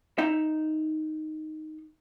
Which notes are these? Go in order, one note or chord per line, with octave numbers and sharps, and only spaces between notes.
D#4 E5